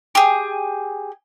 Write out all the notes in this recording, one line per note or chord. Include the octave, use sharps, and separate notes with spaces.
G4 G#4